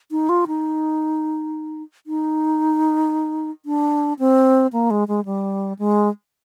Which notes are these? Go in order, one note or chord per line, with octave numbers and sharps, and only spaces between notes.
D#4
F4
D#4
D#4
D4
C4
A#3
G#3
G#3
G3
G#3